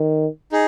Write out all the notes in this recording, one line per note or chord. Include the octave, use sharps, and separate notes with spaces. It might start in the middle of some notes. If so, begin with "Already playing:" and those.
Already playing: D#3
D#4 G#4